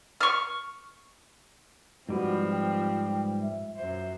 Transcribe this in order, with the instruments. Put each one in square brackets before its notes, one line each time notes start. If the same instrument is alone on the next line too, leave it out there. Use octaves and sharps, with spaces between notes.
[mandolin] C#6 F6
[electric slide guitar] G#2 G3 B4 [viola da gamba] F3 C4 [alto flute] F#4
[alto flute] G5
E5
[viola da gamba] F#2 C5 [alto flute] E5